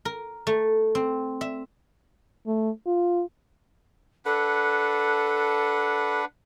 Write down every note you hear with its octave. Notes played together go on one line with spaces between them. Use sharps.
A#4
A3
C4
E5
A3
F4
D4 A4 B4 F#5